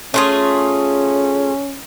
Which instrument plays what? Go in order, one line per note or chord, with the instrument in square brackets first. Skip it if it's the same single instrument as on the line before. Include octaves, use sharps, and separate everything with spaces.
[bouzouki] A3 F4 G#4 [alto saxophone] C#4